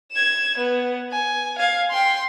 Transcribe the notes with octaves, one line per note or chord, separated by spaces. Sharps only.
G#6 E7
B3
G#5
F5 G#6
G5 C6